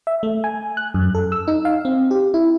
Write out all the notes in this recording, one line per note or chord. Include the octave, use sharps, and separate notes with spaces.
E5
A3
G#5
F#6
F#2
A4
E6
D#4
F5
C4
G4
E4